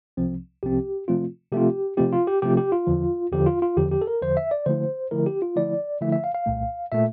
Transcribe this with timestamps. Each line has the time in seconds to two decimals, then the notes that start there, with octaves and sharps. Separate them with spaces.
0.17 C2 C3 F3 C4
0.63 C2 C3 F3 C4 G4
1.08 C3 F3 A3 C4 F4
1.52 C3 F3 A3 C4 F4 G4
1.97 C3 F3 A3 C4 F4 G4
2.12 F4
2.27 G4
2.42 C3 F3 A3 C4 F4 G4
2.57 G4
2.72 F4
2.87 E2 D3 F3
3.32 E2 D3 F3 G4
3.46 F4
3.62 F4
3.76 E2 D3 F3 G4
3.91 G4
4.02 A4
4.07 A#4
4.21 E2 D3 F3 C5
4.37 E5
4.51 D5
4.66 D3 F3 A3 E4 C5
5.11 D3 F3 A3 E4 A#4
5.26 G4
5.42 F4
5.56 D3 F3 A3 E4 D5
6.01 D3 F3 A3 E4 E5
6.12 E5
6.24 F5
6.34 F5
6.46 C2 A#2 A3
6.92 A#2 A3 E5